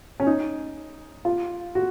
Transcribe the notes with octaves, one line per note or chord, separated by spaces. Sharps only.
C#4
D#4
F4
F#4